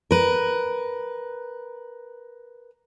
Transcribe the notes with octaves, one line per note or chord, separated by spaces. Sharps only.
A#4 B4